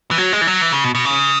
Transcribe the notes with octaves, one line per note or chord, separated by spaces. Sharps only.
E3
F#3
G#3
E3
F#3
E3
C#3
B2
B2
C#3